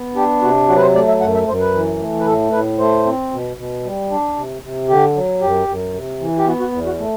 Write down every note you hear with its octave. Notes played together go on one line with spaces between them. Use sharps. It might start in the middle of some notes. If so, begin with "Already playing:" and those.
Already playing: B3
D4 G4
C3 F#4
F#3 F#4
B4
C5
A3 D5
E5
F#2 F#5
E5
F#2 C5
B4
E3
A3
B4
A2 A4
A2 B4
A3 C5
C4
B2
B2
G3
D4
C3
C3
D3 G4
F#3
F#2 G4
F#2
C3
E3
G4
B3 F#4
F#4
E2
F#4
A3